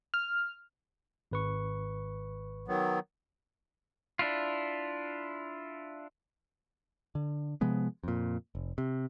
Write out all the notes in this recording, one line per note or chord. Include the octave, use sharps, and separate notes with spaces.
F6
G#1 B4 C#6
D#3 F#3 B3
D4 E4 F4
D3
C3 F3 G#3 B3
F2 A#2
F1
C3